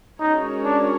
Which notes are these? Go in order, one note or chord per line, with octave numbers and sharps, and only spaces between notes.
G#3 C#4 D#4 F#4 A#4 C#5
D4